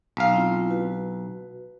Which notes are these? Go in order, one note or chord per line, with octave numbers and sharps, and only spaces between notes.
B1 F5
C4 E4 F4
F#4 B4